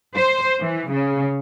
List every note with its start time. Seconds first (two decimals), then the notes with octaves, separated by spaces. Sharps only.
0.17 C5
0.61 E3
0.91 C#3